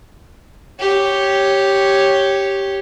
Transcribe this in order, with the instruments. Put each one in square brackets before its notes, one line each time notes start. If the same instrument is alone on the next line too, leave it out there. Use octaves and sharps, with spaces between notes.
[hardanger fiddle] G4 C#5